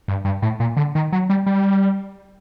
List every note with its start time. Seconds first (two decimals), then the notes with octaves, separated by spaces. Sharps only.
0.08 G2
0.25 G2
0.42 A2
0.60 A#2
0.77 D3
0.95 D#3
1.12 F#3
1.29 G3
1.46 G3